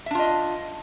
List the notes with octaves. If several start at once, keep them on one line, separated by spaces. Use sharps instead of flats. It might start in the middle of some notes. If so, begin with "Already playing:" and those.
D4 F4 D#5 E5